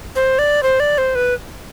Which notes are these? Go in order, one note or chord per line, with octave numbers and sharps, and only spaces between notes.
C5
D5
C5
D5
C5
B4